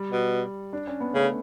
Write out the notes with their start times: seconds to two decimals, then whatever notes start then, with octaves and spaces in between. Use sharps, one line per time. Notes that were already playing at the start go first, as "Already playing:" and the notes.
Already playing: G3
0.11 B2
0.73 D4
0.87 C#4
1.00 B3
1.14 C#3 A3